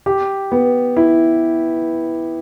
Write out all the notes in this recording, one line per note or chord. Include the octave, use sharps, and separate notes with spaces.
G4
B3
E4